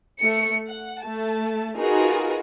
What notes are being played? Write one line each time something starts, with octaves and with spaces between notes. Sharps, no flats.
A3 C#7
F#5
A3 A5
D#4 F4 F#4 G#4 A#4 B4